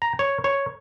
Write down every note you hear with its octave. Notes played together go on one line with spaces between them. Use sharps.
A#5
C#5
C#5